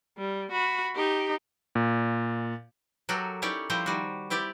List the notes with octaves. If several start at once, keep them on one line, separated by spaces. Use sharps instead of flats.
G3
F#4 B5
D#4 G4
A#2
F#3 F#4 G4 A4 A#4
C#4 D#4 E4 G4 C#5 D5
F3 G3 E4 G4 C5 A#5
D#3 G3 F#4
C4 E4 G4 D5